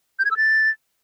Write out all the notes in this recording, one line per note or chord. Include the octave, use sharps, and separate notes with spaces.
G6
G#6
E6
A6